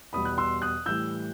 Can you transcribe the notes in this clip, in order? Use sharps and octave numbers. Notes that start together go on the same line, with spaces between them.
E2 B2 G3 B5 D#6
F#6
C6 E6
D#6 F#6
A2 E3 G3 E6 G6